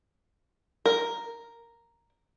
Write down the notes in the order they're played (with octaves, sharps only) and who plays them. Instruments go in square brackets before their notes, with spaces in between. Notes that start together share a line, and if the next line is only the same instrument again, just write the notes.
[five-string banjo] A#4